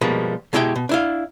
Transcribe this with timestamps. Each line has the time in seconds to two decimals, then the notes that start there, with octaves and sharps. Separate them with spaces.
0.01 B2 F3 G3 G#3 A#3
0.53 B2 G#3 E4 G4 B4 G5
0.76 B2
0.89 D4 E4 F5